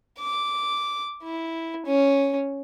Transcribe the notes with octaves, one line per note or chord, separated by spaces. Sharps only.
D6
E4
C#4